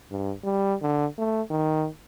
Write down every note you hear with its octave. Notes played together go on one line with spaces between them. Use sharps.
G2
G3
D3
A3
D#3